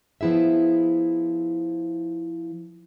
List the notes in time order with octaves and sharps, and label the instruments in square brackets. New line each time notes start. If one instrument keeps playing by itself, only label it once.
[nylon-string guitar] F3 B3 E4 G#4 E5